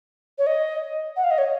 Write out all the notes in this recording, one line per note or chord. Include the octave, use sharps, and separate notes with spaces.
C#5
D#5
F#5
F5
D#5
C#5